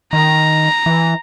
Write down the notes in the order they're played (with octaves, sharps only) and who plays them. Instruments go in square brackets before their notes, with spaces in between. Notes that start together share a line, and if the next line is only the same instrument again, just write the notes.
[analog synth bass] D#3 [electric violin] A#5
[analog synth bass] E3